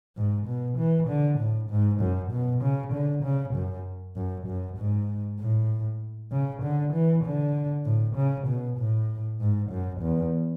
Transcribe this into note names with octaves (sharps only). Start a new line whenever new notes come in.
G#2
B2
E3
D3
A2
G#2
F#2
B2
C#3
D3
C#3
F#2
F#2
F#2
G#2
A2
C#3
D3
E3
D3
A2
C#3
B2
A2
G#2
F#2
E2